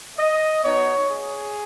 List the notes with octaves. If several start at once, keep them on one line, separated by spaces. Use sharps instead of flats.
D#5
B3 D#4 F#4 C#5
G#4